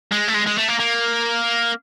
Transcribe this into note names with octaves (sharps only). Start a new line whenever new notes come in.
G#3
A3
G#3
G#3
A3
A#3
A#3